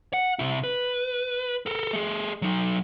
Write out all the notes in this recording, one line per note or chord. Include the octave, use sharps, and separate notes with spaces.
F#5
C3 E4
B4
A4 A#4
A3 G#4
F#3 D#4